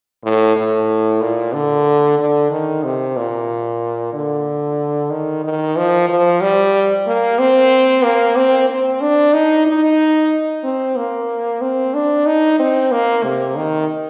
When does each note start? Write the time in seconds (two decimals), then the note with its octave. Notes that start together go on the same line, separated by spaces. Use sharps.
0.24 A2
0.56 A2
1.21 A#2
1.53 D3
2.19 D3
2.51 D#3
2.84 C3
3.17 A#2
4.13 D3
5.11 D#3
5.44 D#3
5.77 F3
6.09 F3
6.41 G3
7.07 A#3
7.39 C4
8.04 A#3
8.36 C4
8.69 C4
9.01 D4
9.33 D#4
9.66 D#4
10.64 C4
10.96 A#3
11.61 C4
11.94 D4
12.26 D#4
12.59 C4
12.92 A#3
13.24 C3
13.56 D#3